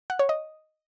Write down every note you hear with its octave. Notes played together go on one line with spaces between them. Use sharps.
F#5
C#5
D#5